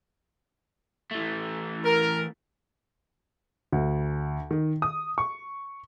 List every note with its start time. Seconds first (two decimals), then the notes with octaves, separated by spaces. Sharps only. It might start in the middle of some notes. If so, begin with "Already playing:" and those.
1.11 E3 A3
1.85 A#4
3.72 D2
4.51 D#3
4.82 D#6
5.18 C#6